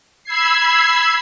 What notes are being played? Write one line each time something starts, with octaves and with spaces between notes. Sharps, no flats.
B5 E6 G#6 C7